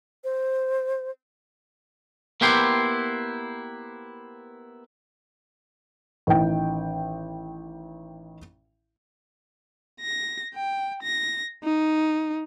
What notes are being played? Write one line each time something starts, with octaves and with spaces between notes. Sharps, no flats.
C5
A#3 B3 E4 G4 C5
A1 D#3 G5
A#6
G5
A#6
D#4